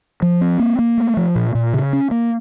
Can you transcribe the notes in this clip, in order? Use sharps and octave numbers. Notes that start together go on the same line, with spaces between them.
F3
C4
A#3
A#3
A3
F3
A#2
A#2
C#3
C#4
A#3